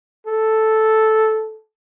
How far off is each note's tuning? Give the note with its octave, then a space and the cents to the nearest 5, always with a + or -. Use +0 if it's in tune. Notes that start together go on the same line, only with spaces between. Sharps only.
A4 -5